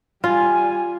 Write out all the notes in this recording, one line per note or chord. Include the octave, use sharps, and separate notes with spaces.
G3 F4 G#5